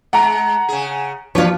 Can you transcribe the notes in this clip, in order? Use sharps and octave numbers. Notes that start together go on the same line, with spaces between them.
G#3 F#5 A#5
C#3 G#4
F3 D4 F4 B4 C#5